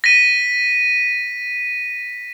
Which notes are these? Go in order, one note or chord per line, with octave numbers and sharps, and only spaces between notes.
A#6 B6 D#7